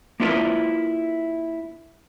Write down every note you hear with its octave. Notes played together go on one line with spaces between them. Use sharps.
A#3 D4 E4 F4 A#4 B4